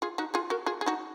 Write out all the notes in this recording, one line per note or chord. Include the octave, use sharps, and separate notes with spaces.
F4 G#4
D#4 F#4
F4 G#4
F#4 A#4
F4 G#4
G#4
D#4 F#4